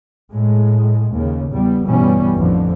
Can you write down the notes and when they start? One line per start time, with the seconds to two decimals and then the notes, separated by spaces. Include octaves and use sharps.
0.32 A2 G#3
1.12 D#2 C#3
1.52 E2 G3 B3
1.86 G2 B2 E3 G3 B3 C#4
2.35 A1 F2 A2 D3 E3 F3